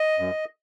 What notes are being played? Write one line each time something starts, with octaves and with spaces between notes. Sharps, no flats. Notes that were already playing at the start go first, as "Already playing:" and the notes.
Already playing: D#5
F#2